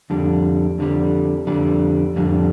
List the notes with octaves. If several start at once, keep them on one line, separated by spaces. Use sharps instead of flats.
F2 D3 G3
F2 D3 G3
F2 D3 G3
F2 D3 G3